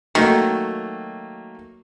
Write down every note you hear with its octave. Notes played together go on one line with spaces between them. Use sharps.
D#3 F#3 A3 A#3